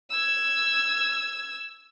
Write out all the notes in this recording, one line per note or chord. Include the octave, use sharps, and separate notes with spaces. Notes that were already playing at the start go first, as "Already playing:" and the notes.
E6 G#6